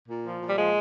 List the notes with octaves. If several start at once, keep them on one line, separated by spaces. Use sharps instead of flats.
A#2
F3
A#2
G3
F3 G#3